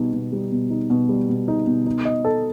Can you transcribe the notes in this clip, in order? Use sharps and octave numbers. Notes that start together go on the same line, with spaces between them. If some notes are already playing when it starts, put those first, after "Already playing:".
Already playing: B2 G3 D#4
B2
G3
B2
D#4
B2
G3
B2
D#4
B2
D#4
D#5
A4